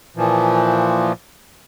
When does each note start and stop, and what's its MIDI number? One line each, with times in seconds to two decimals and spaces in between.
0.16 1.12 46
0.16 1.12 52
0.16 1.12 53